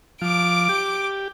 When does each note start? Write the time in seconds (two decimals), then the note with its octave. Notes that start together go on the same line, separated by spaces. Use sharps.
0.22 F3 D6 D7
0.69 G4